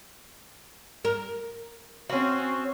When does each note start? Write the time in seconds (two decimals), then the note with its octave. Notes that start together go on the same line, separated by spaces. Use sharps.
1.05 A#4
2.10 C4 C#4 F#4